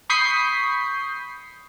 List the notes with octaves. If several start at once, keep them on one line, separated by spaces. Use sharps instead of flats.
B5 C#6 D#6 G6 B6 C7